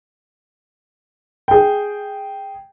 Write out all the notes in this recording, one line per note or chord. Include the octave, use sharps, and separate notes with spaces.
G#4 G5